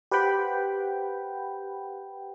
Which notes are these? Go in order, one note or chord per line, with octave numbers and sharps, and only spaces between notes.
G4 B4 C5 F#5 G5 B5